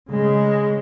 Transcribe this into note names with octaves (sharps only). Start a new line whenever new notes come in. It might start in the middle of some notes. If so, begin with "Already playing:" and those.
C#3 G#3